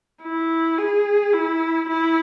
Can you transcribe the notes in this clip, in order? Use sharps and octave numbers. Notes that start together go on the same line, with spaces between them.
E4
G#4
E4
E4